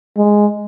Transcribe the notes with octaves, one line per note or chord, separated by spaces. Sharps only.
G#3